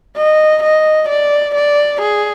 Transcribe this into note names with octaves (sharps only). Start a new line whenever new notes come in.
D#5
D#5
D5
D5
G#4